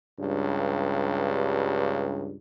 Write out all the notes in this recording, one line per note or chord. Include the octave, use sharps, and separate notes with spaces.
C#2 G2